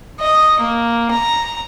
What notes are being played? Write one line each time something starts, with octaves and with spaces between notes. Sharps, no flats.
D#5
A#3
A#5